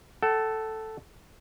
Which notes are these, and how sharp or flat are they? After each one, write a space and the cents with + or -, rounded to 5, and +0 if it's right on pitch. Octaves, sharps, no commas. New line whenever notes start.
A4 +0 F#5 +40